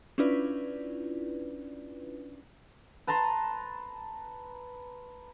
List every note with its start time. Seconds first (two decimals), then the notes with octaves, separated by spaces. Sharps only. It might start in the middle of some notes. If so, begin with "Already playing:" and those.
0.18 C#4 D4 E4 F4 B4 D5
3.07 B4 A5 A#5 C6